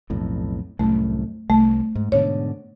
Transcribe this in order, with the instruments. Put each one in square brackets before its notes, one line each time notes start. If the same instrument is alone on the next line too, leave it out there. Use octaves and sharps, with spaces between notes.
[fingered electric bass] B1 F2 A2
[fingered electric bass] C2 F#2 A2 [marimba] A3
[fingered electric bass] C2 [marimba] A3
[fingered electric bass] G#2
[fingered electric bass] G#2 B2 D3 [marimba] C#5